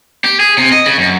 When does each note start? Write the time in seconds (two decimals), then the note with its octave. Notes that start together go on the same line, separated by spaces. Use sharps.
0.24 G4
0.40 G#4
0.58 C3
0.72 D#5
0.86 C#3
0.98 F#2